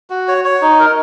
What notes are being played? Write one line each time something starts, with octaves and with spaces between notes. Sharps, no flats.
F#4
C#5
C#5
D#4
A#4